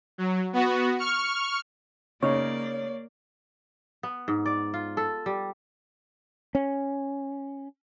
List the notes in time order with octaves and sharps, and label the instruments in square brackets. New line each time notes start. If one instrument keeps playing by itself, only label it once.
[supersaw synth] F#3
B3 F#4
C#6 F6
[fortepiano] C#3 D#4 [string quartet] A#3 D5 [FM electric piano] C#5
[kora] B3
G#2
D5
F4
A4
G3
[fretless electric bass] C#4